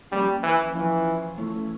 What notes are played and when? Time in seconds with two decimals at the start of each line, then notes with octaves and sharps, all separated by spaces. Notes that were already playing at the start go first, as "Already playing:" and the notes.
0.11 F3 G3 A#3 C#4
0.43 E3
0.74 E3 F3 C#4 F4
1.38 E3 A3 C#4 E4